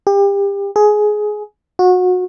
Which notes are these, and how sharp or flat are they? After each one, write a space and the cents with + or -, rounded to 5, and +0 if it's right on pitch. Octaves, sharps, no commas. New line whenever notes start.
G4 +30
G#4 +15
F#4 -25